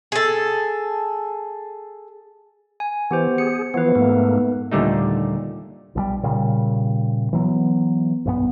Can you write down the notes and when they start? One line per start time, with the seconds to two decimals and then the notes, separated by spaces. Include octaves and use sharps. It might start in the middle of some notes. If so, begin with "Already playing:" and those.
0.12 G#4 A4
2.80 G#5
3.11 E3 B3 G4 C5
3.38 G#4 C#7
3.74 E3 F3 B3 B4
3.95 G#2 A3 A#3
4.72 D#2 A#2 D3 G3 A3 D#4
5.95 B1 E3 G3
6.23 A#2 C#3 G3
7.33 E3 F#3 B3
8.25 B1 G2 F3 B3